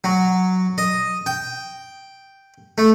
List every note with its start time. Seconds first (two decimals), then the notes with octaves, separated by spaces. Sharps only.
0.04 F#3
0.78 D#5
1.26 G5
2.78 A3